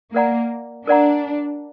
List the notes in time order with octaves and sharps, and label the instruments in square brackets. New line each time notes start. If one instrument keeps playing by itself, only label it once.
[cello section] A#3 [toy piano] A#4 D5 F#5 A#5
[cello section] D4 [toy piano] A#4 D5 F#5 A#5